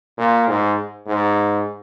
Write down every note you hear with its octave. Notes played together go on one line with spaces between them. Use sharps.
A#2
G#2
G#2